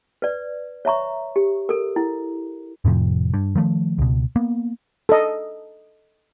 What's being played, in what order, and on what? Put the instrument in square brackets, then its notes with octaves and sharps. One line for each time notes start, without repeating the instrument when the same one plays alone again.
[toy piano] B4 D5
C#5 E5 A#5 C#6
G4
A4 A#4
E4
[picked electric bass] F2 A2 C3 F3
G2
D#3 F3 A3
C#2 B2
A#3 B3
[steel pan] A4 D#5